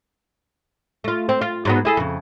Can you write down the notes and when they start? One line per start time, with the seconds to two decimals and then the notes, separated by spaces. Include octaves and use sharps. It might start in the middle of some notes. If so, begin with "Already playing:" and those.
1.04 A3 F4
1.29 C4
1.41 F4
1.65 G#2 F#3 B3
1.85 E4 G#4 A4
1.97 F2 C#3